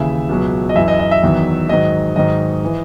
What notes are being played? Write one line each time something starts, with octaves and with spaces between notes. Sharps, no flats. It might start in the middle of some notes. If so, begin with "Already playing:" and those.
Already playing: D#2 C#3 E3 E5
C#2 B2 F#3
D#5
F#2 E3 E5
D#5
D#5
E5
E2 D#3 F#3
G#2 D#3 F#3 D#5
G#2 D#3 F#3 D#5
E3